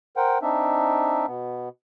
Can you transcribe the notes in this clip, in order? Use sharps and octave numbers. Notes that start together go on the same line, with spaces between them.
A#4 C5 F#5 G5
C4 D4 D#4 E5
B2 B3